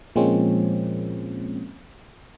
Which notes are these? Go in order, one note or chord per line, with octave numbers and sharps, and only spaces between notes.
A#2 F3 G#3 A#3 C4 C#4